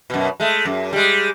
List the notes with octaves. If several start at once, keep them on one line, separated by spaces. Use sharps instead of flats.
F#2 B2
G#3 A3
F#2
G3 G#3